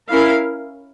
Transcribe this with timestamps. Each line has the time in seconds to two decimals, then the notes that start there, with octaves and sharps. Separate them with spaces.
0.08 C#4 E4 A#4 F5